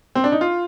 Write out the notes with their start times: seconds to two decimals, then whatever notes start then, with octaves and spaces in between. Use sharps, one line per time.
0.15 C4
0.24 D4
0.32 D#4
0.41 F4